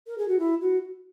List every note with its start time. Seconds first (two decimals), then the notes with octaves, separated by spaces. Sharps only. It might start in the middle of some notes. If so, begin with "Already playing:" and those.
0.06 A#4
0.17 G#4
0.28 F#4
0.39 E4
0.61 F#4